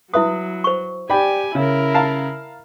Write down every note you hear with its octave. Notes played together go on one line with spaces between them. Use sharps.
F#3 E4 B4 E5 D#6
C5 C#6
G4 D5 G5 G#5 B5
C#3 E4 A#4
F5 A5 A#5